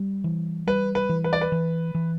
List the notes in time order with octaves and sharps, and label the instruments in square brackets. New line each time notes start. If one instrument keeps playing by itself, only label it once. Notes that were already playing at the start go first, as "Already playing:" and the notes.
Already playing: [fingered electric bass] G3
E3
[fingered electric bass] G3 [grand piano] B4
[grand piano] B4
[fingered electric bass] E3
[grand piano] B4
D5
B4
[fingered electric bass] E3
E3